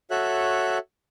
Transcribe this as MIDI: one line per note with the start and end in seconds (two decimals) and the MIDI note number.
0.11 0.78 66
0.11 0.78 69
0.11 0.78 73
0.11 0.78 76
0.11 0.78 90